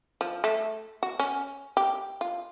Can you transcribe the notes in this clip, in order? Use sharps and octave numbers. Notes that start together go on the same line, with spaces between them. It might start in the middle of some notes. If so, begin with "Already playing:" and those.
F3
A3
F#4
C#4
G4
F4